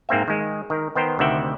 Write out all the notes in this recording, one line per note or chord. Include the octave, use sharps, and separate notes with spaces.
G#2 A#3 C4 E5
D#3 G#3
D#3 A#4
D#3 B3 C5 G5 A#5
D2 C3 D#3 E5 F#5 G5